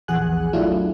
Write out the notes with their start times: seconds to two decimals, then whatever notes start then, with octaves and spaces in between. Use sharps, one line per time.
0.08 A#1 E2 G#4 F#5 G#5 F#6
0.53 F#3 A3 D4 E4 F4